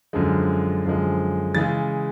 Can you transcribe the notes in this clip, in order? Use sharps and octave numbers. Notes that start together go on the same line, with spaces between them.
F#2 D3 F3 G#3
F#2 D3 F3 G#3
C#3 E3 G#3 A6